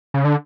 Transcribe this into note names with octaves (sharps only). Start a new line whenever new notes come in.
C#3
D3